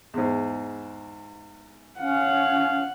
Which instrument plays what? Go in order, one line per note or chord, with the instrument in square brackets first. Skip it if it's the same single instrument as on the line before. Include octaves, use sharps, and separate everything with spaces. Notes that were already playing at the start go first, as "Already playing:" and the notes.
[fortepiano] E2 G#2
[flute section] C#4 [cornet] F5 [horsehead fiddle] F#5